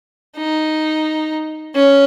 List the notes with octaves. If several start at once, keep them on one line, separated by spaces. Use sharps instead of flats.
D#4
C#4